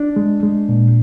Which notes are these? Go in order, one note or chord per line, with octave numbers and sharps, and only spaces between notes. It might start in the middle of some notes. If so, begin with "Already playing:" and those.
Already playing: D4
G#3
G#3
A#2